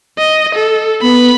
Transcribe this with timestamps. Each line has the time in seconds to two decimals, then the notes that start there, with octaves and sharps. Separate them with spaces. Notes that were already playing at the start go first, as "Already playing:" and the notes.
0.18 D#5
0.55 A4
1.02 B3 B5